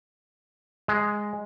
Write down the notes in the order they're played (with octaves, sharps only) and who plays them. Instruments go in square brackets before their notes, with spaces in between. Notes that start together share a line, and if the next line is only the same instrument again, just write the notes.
[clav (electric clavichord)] G#3